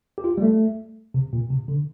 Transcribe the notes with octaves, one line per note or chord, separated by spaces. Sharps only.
G4
F4
G3
A3
C3
A#2
C3
D3